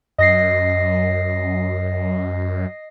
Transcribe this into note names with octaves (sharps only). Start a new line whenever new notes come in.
F#2 D#5 A#6 C7